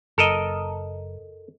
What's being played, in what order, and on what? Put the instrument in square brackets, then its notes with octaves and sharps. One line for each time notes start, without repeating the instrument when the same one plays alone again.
[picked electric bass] F#1 [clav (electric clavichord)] A4 A#4 D#5